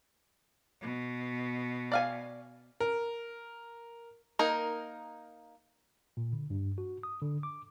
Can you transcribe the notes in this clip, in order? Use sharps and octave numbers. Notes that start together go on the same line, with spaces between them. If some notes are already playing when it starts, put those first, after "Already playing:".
B2
D5 F5 G#5
A#4
A#3 D#4 A#4
A#2
D3
G2
F#4
D#6
D3
D6